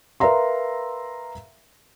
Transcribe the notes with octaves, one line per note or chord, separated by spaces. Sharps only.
A#4 B4 E5 F5 A#5 C6